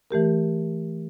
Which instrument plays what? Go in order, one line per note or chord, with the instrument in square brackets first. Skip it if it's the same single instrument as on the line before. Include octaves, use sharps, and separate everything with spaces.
[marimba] E3 A3 G4 A#4